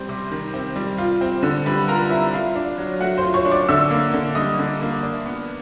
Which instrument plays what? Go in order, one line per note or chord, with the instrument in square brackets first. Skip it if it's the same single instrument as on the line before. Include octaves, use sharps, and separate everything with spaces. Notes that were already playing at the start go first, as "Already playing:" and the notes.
Already playing: [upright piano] G3 C4 C5 C6
C3
D#3
C4
G3
F4
C4
D3
G3 B4 B5
F4 A#4 A#5
C4 E4 E5
F4 F5
D4
F#3
A3 F#4 F#5
C5 C6
F4
C#5 C#6
D4
D5 D6
D3 E5 E6
A#3
D3
G3 D#5 D#6
D3
A#3
D4
B3